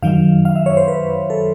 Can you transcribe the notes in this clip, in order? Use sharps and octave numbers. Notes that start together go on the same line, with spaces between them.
F#2 D#3 F#3 F5
F5
E5
C#5
C5
B4
A4